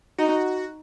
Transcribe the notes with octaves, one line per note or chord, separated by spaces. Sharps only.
D#4 F#4